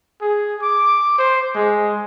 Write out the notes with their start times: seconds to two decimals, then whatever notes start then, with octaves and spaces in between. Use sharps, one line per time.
0.21 G#4
0.62 D6
1.18 C5
1.55 G#3